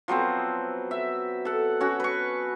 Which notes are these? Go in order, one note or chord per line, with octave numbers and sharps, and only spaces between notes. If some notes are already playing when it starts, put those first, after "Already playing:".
F3 F#3 B3 C4
E5
A4 F#5
C#4 F#4
B4 C#6